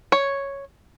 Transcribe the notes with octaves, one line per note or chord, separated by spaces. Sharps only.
C#5